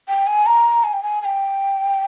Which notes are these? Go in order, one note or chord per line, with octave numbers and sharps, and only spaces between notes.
G5
G#5
A#5
G#5
G5
G#5
G#5
G5